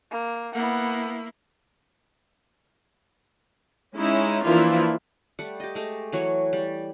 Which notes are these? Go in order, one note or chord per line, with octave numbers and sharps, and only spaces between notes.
A#3
A#3 B3 E4 F#5
G#3 C#4 D#4 E4
E3 F3 A#3 D4 E4 F4
G3 A3 F#5
G4 D#5
G#3 A3 G4
E3 F#3 C#5
G3